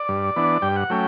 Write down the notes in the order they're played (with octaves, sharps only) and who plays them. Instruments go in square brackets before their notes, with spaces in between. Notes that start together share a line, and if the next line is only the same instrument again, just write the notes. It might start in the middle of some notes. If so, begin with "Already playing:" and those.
Already playing: [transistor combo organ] D5
G2
E3 B3 D4
G2 G5
F#5
F#3 A3 C#4 G5